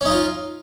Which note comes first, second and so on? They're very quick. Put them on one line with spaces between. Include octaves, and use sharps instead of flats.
C#4 D#4 F4